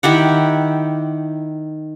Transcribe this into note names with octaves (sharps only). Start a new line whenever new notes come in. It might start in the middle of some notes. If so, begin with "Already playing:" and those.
D#3 E4 G4 F#5